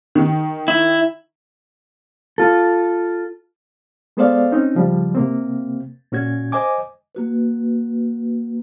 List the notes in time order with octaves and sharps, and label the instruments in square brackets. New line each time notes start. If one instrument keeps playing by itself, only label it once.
[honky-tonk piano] D#3
[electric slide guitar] E4
[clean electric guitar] F4 A4
[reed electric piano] G#3 B3 A4 C5 D5 F5
C4 C#4 D#4
C#3 F3 G3
C3 A#3 C4
A#2 C#4 F#4 G#6
C5 D#5 G#5 D6
[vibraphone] A#3 F#4 B4